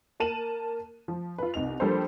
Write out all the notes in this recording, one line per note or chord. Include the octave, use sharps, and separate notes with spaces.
A#3 A#4 A5 D#7 E7 F#7
F3
F4 B4
C2 D#4 F7
F3 G3 A#3 D4 A4 C5